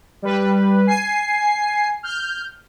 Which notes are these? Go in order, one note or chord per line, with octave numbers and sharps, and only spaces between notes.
G3 B4
G#5 C7
F6 G6